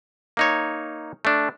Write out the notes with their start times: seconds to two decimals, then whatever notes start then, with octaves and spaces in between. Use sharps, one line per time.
0.37 A#3 D#4 C#5
1.25 A3 D4